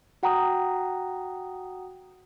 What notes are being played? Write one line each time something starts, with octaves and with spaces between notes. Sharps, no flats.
F#4 F#5 G5 A#5 D#6